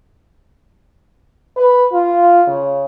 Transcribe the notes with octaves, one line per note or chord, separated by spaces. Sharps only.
B4
F4
C#3